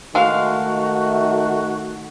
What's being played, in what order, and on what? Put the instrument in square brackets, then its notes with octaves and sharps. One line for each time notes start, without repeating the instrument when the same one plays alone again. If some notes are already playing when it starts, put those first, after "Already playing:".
[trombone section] D#3 A3 [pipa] G#3 F5 [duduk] F#4